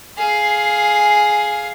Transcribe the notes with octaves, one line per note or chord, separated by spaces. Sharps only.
G#4 F5